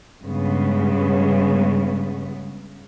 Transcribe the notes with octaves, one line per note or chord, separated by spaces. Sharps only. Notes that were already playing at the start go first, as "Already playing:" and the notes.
G2 C#3 G#3 B3